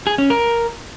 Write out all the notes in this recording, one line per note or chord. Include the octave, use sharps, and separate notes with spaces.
G#4
C#4
A#4